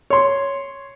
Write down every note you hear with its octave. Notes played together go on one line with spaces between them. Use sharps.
C#5 C6